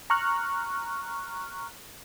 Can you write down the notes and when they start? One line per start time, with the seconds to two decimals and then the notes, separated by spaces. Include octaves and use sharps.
0.10 A#5 C#6 F6 F#6